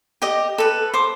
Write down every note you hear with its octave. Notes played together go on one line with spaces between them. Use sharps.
G4 D#5
A4 B4
C5 D6